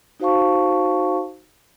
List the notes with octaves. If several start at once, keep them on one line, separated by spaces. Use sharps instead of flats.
D#4 F#4 C5 F5 A5 C#6